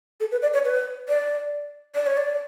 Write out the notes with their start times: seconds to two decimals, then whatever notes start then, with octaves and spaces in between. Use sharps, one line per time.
0.20 A4
0.32 B4
0.42 D5
0.54 C#5
0.65 B4
1.09 D5
1.95 D5
2.07 C#5
2.17 D5